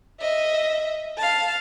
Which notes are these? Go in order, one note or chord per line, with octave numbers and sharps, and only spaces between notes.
D#5 E5
F5 A5